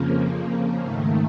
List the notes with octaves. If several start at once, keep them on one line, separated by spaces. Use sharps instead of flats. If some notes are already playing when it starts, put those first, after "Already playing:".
Already playing: F2 C#3 F3 A#3
G#2 D#3 A3